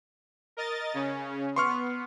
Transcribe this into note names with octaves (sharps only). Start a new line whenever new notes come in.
A#4 D#5 A6
C#3 C#4
B3 C6 C#6 F6